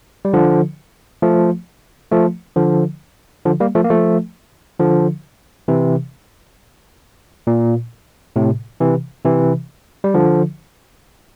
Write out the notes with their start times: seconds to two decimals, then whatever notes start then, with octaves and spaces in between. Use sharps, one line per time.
0.25 G3
0.33 D3 F3
1.22 F3 A3
2.12 F3 A3
2.56 D3 F3
3.46 D3 F3
3.60 G3 A#3
3.75 F3 A3
3.84 A#3
3.90 F3 A3
4.79 D3 F3
5.68 C3 E3
7.47 A#2
8.36 A2 C3
8.80 C3 E3
9.25 C3 E3
10.04 G3
10.14 D3 F3